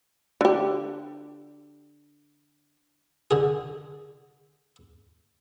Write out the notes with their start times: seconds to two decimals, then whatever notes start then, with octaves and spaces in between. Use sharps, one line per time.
0.41 D3 G4
3.31 D3 G#4